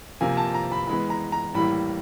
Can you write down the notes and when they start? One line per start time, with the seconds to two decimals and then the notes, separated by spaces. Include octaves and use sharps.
0.21 C3 F3 A#3 G#5
0.37 A5
0.54 A#5
0.72 B5
0.87 E3 G#3 B3 B5
1.10 A#5
1.32 A#5
1.54 A2 E3 G3 A#3 B5